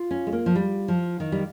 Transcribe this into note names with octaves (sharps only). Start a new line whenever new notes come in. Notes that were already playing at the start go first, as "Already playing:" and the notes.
Already playing: F4
C#4
G#3
A#3
F3
G3
F3
D#3
G3